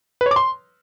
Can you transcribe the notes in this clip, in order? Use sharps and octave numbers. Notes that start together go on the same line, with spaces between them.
B4
C#5
D6
C6